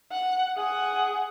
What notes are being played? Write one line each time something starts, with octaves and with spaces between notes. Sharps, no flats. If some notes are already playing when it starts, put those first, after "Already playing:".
F#5
G#4 F#5